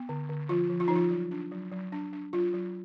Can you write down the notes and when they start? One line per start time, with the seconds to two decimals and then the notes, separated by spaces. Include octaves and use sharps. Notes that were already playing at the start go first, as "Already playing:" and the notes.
Already playing: B3
0.09 D3
0.29 D3
0.49 F3 F4
0.70 F3
0.80 F4
0.88 F3 D#4
0.96 F4
1.11 F#3
1.31 D4
1.51 F#3
1.72 F#3
1.92 D4
2.13 D4
2.33 F#3 F4
2.53 F#3